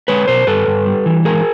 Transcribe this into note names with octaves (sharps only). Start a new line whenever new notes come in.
G#3 B4 C#5
B2 A#4 C5
G2 A4 B4
G2
G3
E3
G#3 G#4 A#4